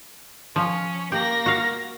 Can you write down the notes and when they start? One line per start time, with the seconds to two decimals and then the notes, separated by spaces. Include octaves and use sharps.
0.56 F3 C#4
1.12 A#3 G4 A#6
1.46 F#4 F5